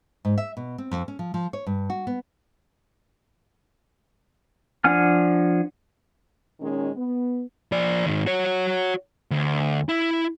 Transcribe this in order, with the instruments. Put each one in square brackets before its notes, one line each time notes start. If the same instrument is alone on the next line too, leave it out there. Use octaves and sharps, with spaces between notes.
[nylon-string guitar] G#2
E5
B2
C4
F2
C#4
F3
F3
C#5
G2
F#4
B3
[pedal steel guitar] F3 D4 F#5 G#5 F6
[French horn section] A#2 D#3 G#3 C#4
B3
[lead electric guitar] F3 D5
G#2 D#3
F#4 C#5
D2
E4